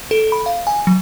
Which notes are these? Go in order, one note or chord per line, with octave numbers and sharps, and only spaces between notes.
A4
B5
F5
G#5
F#3